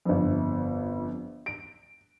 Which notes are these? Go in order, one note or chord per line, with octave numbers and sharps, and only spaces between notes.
G1 F2
D7